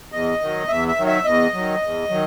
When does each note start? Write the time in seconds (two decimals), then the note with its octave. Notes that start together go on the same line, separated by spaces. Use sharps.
0.12 E2 D#5
0.41 D#3 F#3
0.68 E2 E5
0.88 E5
0.97 D#3 F#3
1.07 E5
1.25 E2 D#5
1.53 D#3 F#3
1.82 E2
2.09 D#3 F#3